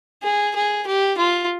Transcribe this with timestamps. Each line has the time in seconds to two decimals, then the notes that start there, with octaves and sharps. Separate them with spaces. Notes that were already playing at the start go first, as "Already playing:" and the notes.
0.23 G#4
0.55 G#4
0.87 G4
1.18 F4